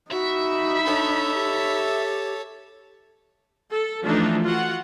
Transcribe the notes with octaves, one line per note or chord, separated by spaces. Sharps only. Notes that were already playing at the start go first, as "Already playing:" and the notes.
D#4 F#4 E5 B5
D4 A4 C#5
G4
A4
E3 F3 A3 D4 D#4
F4 F#4 F#5